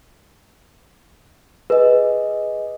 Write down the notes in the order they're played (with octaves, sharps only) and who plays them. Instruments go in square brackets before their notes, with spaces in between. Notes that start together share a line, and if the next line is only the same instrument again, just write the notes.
[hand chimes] G#4 D#5 [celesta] B4